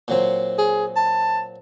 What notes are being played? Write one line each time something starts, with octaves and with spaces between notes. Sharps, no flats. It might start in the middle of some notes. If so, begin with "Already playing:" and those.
A#2 F#3 C4
G#4
A5